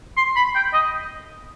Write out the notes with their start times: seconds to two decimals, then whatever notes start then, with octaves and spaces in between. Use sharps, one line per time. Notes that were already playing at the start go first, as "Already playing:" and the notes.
0.17 C6
0.36 B5
0.55 G5
0.73 D#5